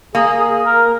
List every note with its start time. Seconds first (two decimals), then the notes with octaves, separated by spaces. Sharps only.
0.15 A#3 G#4
0.40 G#4
0.65 A#4